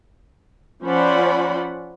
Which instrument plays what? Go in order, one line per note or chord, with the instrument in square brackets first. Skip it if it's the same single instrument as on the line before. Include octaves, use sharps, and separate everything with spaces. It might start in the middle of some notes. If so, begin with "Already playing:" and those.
[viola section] F3 C#4 C5 D5 F#5 B5